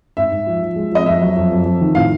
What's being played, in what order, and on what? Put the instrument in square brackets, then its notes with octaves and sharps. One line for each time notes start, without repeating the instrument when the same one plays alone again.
[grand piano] G#2 [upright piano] E5
[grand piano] G#2
F3
F3
G#3
[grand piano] F3 [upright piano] D#5
[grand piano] F2 [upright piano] E5
[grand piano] F#3
F2
F2
F2
D#3
[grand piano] A2 [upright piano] F5